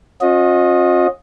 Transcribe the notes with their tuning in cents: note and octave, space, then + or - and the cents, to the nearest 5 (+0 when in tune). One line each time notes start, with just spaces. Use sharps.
C#4 -35 F4 +45 D#5 +0